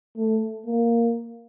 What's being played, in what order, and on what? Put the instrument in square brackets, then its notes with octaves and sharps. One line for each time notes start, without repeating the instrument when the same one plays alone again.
[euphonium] A3
A#3